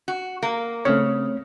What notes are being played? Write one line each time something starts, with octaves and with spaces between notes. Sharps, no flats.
F#4
A#3
C#3 A3 C4 C#5